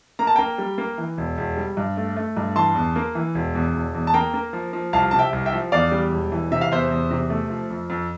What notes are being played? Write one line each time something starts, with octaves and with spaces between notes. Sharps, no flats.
A#3 A#5
A5
A#3 G5 A#5
G3
A#3
E3
E1
E1
G3
G2
A3
A3
G2
E3 A5 C6
E2
A#3
E3
E1
E2
E1
E2
A5
A#3 G5 A#5
A#3
F3
F3
C2 F5 A5
C3 A5
E5 G5
C2
E5 G5
F3
E2 D5 F5
G3
E1
E3
C3 E5
F5
E2 C5 E5
E2
C3
A3
F3
F2
F2